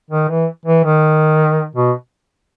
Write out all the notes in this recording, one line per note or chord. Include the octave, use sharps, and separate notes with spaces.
D#3
E3
E3
D#3
B2